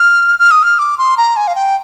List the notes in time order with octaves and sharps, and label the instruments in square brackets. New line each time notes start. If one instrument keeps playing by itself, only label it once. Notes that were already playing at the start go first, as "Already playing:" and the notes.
Already playing: [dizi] F6
F6
D#6
F6
D6
C6
A#5
G#5
F5
G5